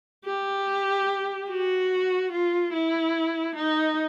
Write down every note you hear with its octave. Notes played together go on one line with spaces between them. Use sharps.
G4
F#4
F4
E4
D#4